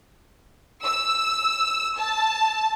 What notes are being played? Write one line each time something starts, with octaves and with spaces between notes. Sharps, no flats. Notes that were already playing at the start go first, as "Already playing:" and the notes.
E6
A5